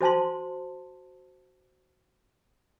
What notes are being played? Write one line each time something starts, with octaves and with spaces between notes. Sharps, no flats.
F#4 C5 G#5 A5 C6